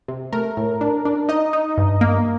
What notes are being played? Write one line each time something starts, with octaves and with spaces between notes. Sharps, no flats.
C3
A3 A#4
A2
D4
D4
D#4 D#5
D#4
G2
A#3